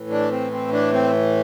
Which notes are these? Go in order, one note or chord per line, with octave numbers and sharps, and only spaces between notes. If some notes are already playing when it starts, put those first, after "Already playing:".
Already playing: A2 E3
D4
C4
C4
D4
C4